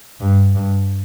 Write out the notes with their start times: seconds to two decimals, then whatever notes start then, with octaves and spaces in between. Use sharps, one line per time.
0.20 G2
0.55 G2